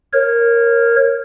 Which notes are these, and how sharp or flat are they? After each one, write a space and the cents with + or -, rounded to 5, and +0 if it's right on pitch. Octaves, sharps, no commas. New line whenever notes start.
A#4 +0 C#5 -25